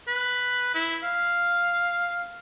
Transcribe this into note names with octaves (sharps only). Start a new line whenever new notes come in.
B4
E4
F5